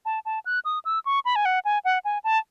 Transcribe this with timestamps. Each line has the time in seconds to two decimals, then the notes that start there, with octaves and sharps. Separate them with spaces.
0.05 A5
0.25 A5
0.46 F#6
0.65 D#6
0.85 E6
1.06 C#6
1.25 B5
1.36 G#5
1.45 F#5
1.65 G#5
1.85 F#5
2.05 G#5
2.24 A5